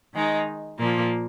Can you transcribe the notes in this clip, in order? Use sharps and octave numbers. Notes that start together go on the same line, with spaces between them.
D#3 G#3 D#4
A#2 F3 A#3